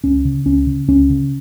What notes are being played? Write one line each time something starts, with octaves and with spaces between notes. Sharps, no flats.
C#2 C#4
C#3
C#2 C#4
C#3
C#2 C#4
C#3